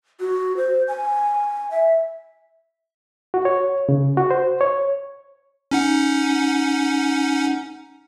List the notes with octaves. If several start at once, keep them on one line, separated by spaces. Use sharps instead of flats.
F#4
C5
G#5
E5
F#4
C#5
C#3
F#4
C5
C#5
C#4 D#4 F#5